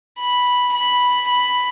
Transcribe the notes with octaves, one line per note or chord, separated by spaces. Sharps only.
B5
B5
B5